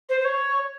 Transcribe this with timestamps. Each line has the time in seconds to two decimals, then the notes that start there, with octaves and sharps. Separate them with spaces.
0.09 C5
0.20 C5
0.24 C#5